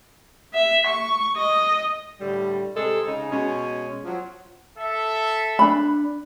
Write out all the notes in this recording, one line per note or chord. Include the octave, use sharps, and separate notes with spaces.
E5
C#6
D#5
A2 D3 G3
C3 G#3 G#4 A4
C#3 D#4
B2 G#3 C#4
F3 F#3
A4 E5
D4 B5